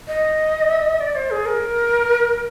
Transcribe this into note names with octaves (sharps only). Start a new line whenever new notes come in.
D#5
D5
C5
G#4
A#4